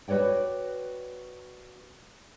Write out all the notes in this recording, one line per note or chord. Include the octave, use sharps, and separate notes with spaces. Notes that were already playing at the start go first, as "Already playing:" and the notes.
F#4 B4 C#5 D5 G5